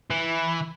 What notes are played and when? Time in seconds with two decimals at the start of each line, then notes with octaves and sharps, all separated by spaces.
0.10 E3